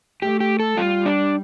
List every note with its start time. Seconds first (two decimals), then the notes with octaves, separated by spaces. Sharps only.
0.22 A3 G4
0.40 G4
0.60 A4
0.77 G3 F4
1.06 D4